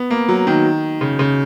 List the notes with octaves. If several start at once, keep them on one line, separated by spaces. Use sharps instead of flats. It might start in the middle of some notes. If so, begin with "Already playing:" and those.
Already playing: B3
A#3
F#3
D#3
C#3
C#3